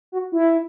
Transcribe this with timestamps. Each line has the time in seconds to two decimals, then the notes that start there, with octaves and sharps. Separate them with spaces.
0.12 F#4
0.32 E4